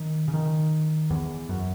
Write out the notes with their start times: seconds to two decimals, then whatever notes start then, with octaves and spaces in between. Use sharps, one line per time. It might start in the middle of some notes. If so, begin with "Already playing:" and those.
Already playing: D#3
0.28 C#3
0.34 D#3
1.10 E2
1.49 F#2